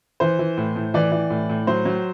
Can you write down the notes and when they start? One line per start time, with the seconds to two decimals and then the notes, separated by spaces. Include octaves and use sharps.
0.20 E3 C5
0.39 E3
0.57 A2
0.76 A2
0.94 E3 D5
1.12 E3
1.30 A2
1.49 A2
1.67 F#3 C5
1.85 F#3